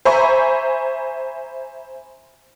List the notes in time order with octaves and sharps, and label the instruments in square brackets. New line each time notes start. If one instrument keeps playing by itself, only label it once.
[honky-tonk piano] C5 E5 G#5 A#5 B5 C#6